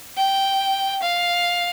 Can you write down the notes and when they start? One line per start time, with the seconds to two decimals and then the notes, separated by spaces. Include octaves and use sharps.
0.17 G5
1.02 F5